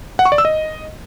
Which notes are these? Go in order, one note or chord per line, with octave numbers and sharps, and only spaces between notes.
F#5
C#6
D5
E6
D#5